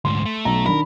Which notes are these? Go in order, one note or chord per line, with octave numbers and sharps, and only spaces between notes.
D2 G#2 C6
A3
B1 A#5
D#3 D4 A#4 B5